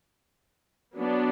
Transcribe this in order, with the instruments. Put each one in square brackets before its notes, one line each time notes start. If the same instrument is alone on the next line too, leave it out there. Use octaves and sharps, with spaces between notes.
[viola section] F#3 B3 D4